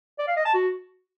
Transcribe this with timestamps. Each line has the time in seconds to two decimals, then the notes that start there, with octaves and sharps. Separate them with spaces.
0.19 D5
0.28 F5
0.36 D#5
0.45 A5
0.54 F#4